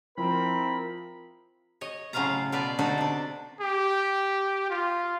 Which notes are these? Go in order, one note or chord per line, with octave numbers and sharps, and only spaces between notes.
F3 C4 E4 A#4 B5
C#5 D#5
A2 C#3 F#3 F4 F5 A#5
B2 F4 A4 B4 D5
D3 D4 D#4 F#4 A4 D5
C3 D4
G4
F4